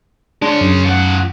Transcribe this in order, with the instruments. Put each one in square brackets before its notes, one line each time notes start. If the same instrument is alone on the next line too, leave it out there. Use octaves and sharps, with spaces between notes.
[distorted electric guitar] G#3 C#5 [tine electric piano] D4
[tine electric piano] F#2
[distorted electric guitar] F3 F#5